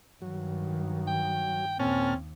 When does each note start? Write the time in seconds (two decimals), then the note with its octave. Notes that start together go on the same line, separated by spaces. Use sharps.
0.22 G2 D#3 F#3
1.08 G5
1.79 D#2 A#2 C4 C#4 A5 F6